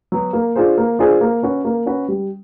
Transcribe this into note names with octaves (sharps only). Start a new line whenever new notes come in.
F#3 B3
A#3
D4 F4 G#4 C5
A#3
D4 F4 G#4 C5
A#3
C#4 F#4 B4
A#3
C#4 F#4 B4
G3